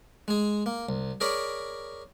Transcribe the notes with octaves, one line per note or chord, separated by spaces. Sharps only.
G#3 G#4
A#3
C2
G#4 A#4 C#5 D5 B5